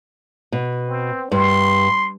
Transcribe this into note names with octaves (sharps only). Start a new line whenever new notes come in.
B2
C4
G2 C6